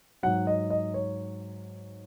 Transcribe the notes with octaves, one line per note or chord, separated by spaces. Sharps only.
G#2 F#3 F#5
D#5
D#5
C#5